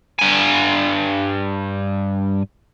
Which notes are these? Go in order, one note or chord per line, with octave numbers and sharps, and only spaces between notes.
G2 G#5